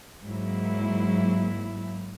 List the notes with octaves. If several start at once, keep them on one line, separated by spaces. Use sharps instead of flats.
G#2 F#3 A#3 E4